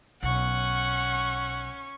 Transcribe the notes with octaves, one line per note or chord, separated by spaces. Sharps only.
B1 C#4 F#5 C#6